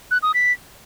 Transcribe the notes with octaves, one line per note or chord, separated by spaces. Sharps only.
F#6
D#6
B6